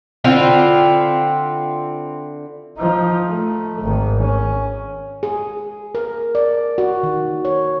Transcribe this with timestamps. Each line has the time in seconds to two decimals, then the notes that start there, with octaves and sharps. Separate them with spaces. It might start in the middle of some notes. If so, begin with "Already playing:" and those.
0.24 D3 C4 E4 F4
2.78 F3 D#4
3.28 A3
3.82 G#1 D#3
4.21 C#4
5.23 G#4
5.95 A#4
6.35 D5
6.78 F#4
7.03 D#3
7.45 C#5